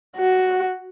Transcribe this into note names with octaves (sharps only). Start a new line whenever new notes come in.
F#4